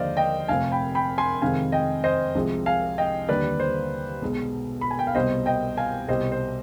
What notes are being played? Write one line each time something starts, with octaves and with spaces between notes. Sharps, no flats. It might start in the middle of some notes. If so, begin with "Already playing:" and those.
Already playing: D#2 D3 F3 G#3 C5 D5 D#5 F5
D#5 G5
F1 F2 C3 F5 G#5
G5 B5
G5 B5
G#5 C6
F2 C3 D#3 G#3 F5 G#5
D#5 G5
C5 D#5
C2 C3 F3 G#3
F5 G#5
D#5 G5
D#2 D3 G3 B4 D5
C5
B1 B2 G#3
B5
G#5
G5
F5
C2 B2 G3 C5 D#5
D#5 G5
F5 G#5
C2 B2 G3 C5 D#5
C5